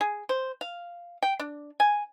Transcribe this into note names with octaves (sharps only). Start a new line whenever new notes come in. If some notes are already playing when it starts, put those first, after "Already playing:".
G#4
C5
F5
G5
D4
G#5